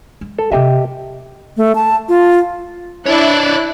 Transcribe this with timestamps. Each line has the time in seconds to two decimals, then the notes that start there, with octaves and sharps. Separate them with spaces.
0.21 G#3
0.39 A4
0.52 C3 E4 G4 D#5 E5
1.57 A3
1.75 A5
2.08 F4
3.06 D4 E4 C#5 D5 F#6